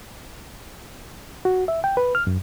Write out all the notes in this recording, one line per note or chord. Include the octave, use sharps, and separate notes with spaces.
F#4
E5
G5
B4
F6
F#2